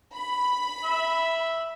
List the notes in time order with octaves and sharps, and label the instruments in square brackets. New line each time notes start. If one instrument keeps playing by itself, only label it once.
[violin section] B5
[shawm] E5